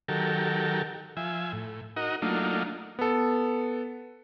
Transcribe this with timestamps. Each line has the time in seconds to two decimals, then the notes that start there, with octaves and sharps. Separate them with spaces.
0.08 D#3 F#3 G4 A4 A#4
1.17 F3 E5 G#5
1.53 A2
1.97 D#4 F#4 A#4 D#5
2.22 F#3 A3 A#3 D4 D#4 F4
2.99 B3 A4